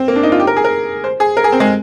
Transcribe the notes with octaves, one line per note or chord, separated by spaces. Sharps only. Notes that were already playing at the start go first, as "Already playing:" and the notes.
Already playing: C4
A#3
D4
D#4
F4
G4
A#4
G#4
A#4
C5
G#4
A#4
G#4
C4
G#3